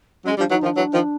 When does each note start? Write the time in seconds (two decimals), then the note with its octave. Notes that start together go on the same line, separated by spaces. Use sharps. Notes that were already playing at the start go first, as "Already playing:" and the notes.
0.25 F#3 G#3 C#4
0.37 F3 G3 D4
0.50 E3 F#3 D#4
0.63 D#3 F3 D4
0.76 E3 F#3
0.93 D#3 F3